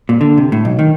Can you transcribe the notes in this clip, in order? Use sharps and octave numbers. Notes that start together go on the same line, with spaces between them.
A#2
D3
C3
A2
B1
D#3